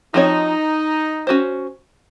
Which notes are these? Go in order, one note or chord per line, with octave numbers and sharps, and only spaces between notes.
F3 C4 D#4 F#4 C#5
C#4 F#4 C5